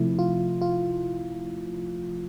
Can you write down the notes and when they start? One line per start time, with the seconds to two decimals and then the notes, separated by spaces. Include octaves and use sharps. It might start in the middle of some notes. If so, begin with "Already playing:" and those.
Already playing: C3 F3 A3 E4
0.19 F4
0.61 F4